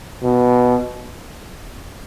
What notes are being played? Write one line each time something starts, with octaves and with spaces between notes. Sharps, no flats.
B2